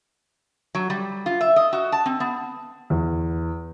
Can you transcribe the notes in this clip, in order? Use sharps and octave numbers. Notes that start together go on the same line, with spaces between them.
F#3
G3
F4
E5
D#5
F#4
A5
C4
B3
E2